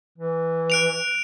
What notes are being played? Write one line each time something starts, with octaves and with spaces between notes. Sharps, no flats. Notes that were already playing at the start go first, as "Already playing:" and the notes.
E3
F#6 D7 F7